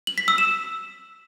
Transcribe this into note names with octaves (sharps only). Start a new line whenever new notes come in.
F#7
B6
E6
E7